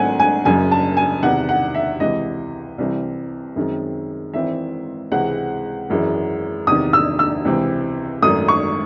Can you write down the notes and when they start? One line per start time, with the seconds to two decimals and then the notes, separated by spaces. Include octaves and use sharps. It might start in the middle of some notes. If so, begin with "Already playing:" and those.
Already playing: G#1 G#2 F#3 A3 C4 F#5 G#5
0.20 G#5
0.45 F#1 F#2 C#3 G#5
0.72 A5
0.97 G#5
1.23 E2 C3 D#3 F#5
1.49 F#5
1.74 E5
2.00 C#2 C3 E3 D#5
2.78 C2 C3 E3 C4
3.56 F#2 D#3 G#3 C4
4.33 G#1 G#2 E3 C4 E5
5.12 C#2 C3 E3 G#3 C4 F#5
5.89 G#1 F#2 E3 G#3
6.67 E2 C3 D#3 D#6
6.93 E6
7.19 E6
7.45 C#2 C3 E3 C4
8.22 G#1 F#2 D#3 A3 D#6
8.48 C#6